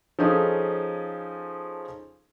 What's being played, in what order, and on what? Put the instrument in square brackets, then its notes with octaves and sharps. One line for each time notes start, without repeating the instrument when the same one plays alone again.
[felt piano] F3 C#4 D#4 G#4 A4